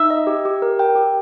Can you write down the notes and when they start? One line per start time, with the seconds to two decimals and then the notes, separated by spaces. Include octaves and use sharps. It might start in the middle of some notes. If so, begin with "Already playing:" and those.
Already playing: D#4 E5
0.10 D#5
0.27 G4
0.45 G4
0.62 A#4
0.79 G5
0.96 G4